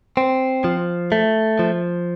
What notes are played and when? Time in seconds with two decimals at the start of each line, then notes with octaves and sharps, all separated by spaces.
0.17 C4
0.64 F3
1.12 A3
1.59 F3